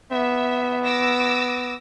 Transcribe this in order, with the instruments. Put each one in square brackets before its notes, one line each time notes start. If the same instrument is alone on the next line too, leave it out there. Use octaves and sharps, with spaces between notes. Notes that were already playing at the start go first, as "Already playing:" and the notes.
[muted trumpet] B3 [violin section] E5
[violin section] D6 E6 A#6